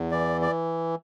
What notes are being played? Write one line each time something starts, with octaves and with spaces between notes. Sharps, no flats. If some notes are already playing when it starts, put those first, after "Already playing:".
Already playing: E2
E3 D5
D5